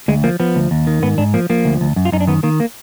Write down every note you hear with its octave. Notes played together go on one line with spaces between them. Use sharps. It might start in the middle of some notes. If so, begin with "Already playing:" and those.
D2 G#3
F3 A#3
F3 B3
D2
D#2
D#3
G#2 B3
G#2 D4
F3 A#3
F3 A#3
D2
D2
F#2
F4
F#2 D#4
D4
D#3 B3
D#3 A#3
A#3